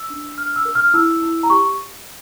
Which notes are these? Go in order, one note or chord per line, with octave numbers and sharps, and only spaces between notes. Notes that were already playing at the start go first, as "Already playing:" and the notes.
Already playing: E6
D4
D4 F6
E6
A#4
F6
E4 E6
E4
A#5
G4 C#6